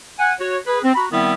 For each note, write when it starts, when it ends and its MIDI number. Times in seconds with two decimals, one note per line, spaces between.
0.19 0.33 78
0.19 0.33 80
0.40 0.57 66
0.40 0.57 73
0.66 0.79 68
0.66 0.79 71
0.84 0.93 60
0.95 1.05 66
0.95 1.05 82
0.95 1.05 83
1.11 1.34 51
1.11 1.34 55
1.11 1.34 59
1.11 1.34 60
1.11 1.34 64